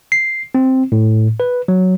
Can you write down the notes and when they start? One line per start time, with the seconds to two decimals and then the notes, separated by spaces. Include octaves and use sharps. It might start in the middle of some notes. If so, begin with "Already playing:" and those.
0.12 C7
0.55 C4
0.92 A2
1.40 B4
1.68 F#3